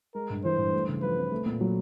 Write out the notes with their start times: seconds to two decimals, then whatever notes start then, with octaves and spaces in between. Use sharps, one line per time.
0.15 G#3 A#4
0.30 G2
0.44 E3 C5
0.58 G2
0.73 A3
0.88 C#3
1.02 F3 B4
1.17 C4
1.31 A3
1.46 A#2
1.61 F#3